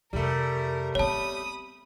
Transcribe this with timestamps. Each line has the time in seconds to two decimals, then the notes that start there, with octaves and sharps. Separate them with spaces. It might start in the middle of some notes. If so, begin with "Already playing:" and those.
0.13 F2 C3 G3 A3 A#4
0.95 B3 C4 C#5 A5 B5 D#6